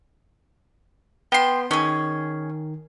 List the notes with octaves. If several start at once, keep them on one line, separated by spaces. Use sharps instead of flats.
B3 G5 C6
D#3 C#4 G#4